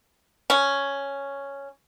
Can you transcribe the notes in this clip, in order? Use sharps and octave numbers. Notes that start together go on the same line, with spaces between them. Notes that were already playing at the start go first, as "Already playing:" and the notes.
C#4